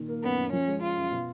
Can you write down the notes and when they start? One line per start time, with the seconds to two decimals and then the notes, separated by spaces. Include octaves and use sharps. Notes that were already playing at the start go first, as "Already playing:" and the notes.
Already playing: A#2 D#3
0.08 A#3
0.23 F#2 B3
0.38 F#2
0.52 F3 C#4
0.68 G#3
0.82 C#4 F4
0.97 F#2
1.11 B2